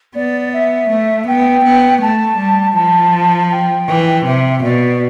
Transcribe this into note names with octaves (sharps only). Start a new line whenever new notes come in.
B3 D5
E5
A3
B3 G5
B3
A3 A5
G3
F3 A5
G5
E3
C3 E5
B2 D5